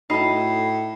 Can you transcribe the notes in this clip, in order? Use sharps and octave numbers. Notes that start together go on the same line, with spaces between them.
A2 D#4 F#4 A4 B5 C7